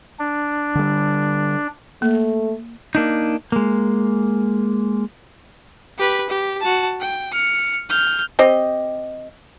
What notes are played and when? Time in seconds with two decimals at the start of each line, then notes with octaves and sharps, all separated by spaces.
0.19 D4
0.75 D3 G3
2.02 A3 A#3
2.95 A#3 D4 D#4
3.52 G#3 A#3
5.98 G4 B4
6.30 G4
6.60 F#4 A5
7.01 G5
7.33 F6 C#7
7.90 F6 G6
8.39 C4 G4 D#5